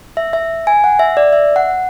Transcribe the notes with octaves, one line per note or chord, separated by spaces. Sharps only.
E5
E5
G#5
F#5
E5
D5
E5
F#5